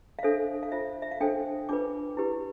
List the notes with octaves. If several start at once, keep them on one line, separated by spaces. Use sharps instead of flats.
F5
D4 A4 C5 E5
F5
F4 C5 E5
E5
F5
D4 A4 C5 G5
D4 F4 B4 D6
E4 G4 B4